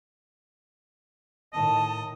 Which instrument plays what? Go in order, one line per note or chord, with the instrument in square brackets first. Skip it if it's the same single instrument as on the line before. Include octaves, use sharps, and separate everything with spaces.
[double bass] A2 D#3 [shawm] D#5 [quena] A5